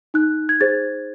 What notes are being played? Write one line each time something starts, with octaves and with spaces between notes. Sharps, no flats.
D#4 F#6
G#6
G#4 C5 A6